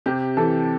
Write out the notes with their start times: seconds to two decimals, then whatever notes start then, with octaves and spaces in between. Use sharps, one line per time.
0.06 C3 G4
0.37 E3 A4